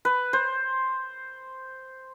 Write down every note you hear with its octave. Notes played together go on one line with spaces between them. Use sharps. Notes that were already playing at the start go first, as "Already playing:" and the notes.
B4
C5